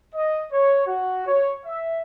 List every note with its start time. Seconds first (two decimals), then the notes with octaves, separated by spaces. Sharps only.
0.14 D#5
0.51 C#5
0.86 F#4
1.26 C#5
1.65 E5